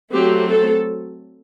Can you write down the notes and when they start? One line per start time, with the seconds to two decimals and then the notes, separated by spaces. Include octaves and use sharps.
0.13 F#3 A3 C4 G4
0.48 A4